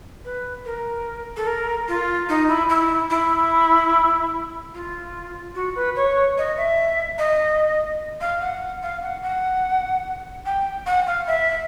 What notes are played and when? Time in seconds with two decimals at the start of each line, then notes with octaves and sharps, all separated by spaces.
0.25 B4
0.65 A#4
1.36 A4
1.47 A#4
1.88 F4
2.29 D#4
2.49 E4
2.69 E4
3.10 E4
4.74 F4
5.55 F#4
5.75 B4
5.96 C#5
6.38 D#5
6.57 E5
7.18 D#5
8.21 F5
8.41 F#5
8.83 F5
9.03 F#5
9.23 F#5
10.46 G5
10.86 F#5
11.07 F5
11.27 E5